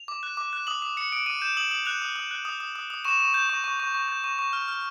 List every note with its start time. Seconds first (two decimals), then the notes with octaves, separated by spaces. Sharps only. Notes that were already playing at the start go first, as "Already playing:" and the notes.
Already playing: F7
0.08 D6
0.23 F#6
0.37 D6
0.53 F#6
0.67 D#6 F#7
0.82 D#6
0.97 D#6 C#7
1.12 D#6 D7
1.26 D#6 D#7
1.41 G6 E7
1.57 D#6 F#7
1.71 D#6 F#7
1.86 F#6 F7
2.02 D#6
2.16 D#6
2.31 F#6
2.45 D#6
2.60 D#6
2.76 D#6
2.90 D#6
3.05 C#6 E7
3.20 C#6
3.34 G6
3.50 C#6
3.64 C#6
3.80 C#6
3.94 C#6
4.08 G6
4.24 C#6
4.39 C#6
4.53 F6
4.68 F6